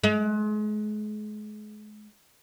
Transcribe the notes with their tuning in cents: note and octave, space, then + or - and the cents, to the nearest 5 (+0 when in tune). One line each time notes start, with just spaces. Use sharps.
G#3 +35